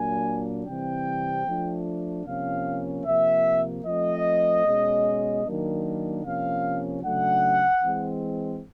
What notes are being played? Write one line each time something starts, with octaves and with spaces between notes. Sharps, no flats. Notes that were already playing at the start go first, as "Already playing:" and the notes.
Already playing: A#2 F#3 A#3 D4 G#5
C3 E3 G3 C4 G5
F3 A3 D4
C3 F3 A#3 C#4 F5
C3 F3 A#3 E5
F3 A3 C4 D#5
B2 G#3 C#4
D#3 F#3 A#3 D4
C3 F3 A#3 C#4 F5
C#3 F#3 A3 D4 F#5
E3 G#3 C4